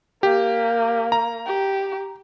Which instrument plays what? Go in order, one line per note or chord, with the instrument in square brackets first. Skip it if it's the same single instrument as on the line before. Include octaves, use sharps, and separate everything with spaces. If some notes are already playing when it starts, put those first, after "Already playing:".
[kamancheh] A#3 [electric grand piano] G4
[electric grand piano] A#5
[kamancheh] G4